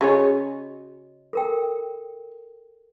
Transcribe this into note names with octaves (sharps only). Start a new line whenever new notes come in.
C#3 F#4 G#4 C#5 D#5
A4 A#4 G5